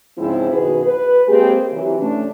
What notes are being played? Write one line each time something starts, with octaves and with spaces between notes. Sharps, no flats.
G#2 C#3 F3 C4 E4
F#2 B2 D#3 F#4 G#4 B4
B4
G#3 A#3 C4 G4 G#4
C3 E3 F#3 E4
A3 C#4 D4